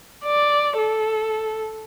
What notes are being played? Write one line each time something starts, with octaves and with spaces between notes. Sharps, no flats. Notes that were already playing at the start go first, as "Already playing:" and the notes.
D5
A4